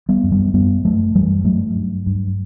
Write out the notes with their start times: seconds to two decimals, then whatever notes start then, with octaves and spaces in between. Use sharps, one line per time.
0.09 G3 B3
0.23 F#2
0.32 G3 B3
0.54 F#2 G3 B3
0.84 F#2 F#3 A3
1.15 F#2 E3 G3
1.44 G2 F#3 A3
1.75 G2
2.06 G2